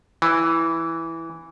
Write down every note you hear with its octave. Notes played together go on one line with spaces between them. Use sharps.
E3